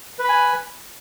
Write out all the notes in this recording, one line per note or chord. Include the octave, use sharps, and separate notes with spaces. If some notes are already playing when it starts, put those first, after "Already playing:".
B4 G#5 B5